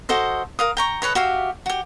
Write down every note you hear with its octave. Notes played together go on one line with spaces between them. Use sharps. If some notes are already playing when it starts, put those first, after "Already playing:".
F#4 A4 C5 D#5
A#4 F5 D#6
G5 A#5 C#6
A4 B4 C#5 D#5
F#4 G4 E5 F5
F#4 G4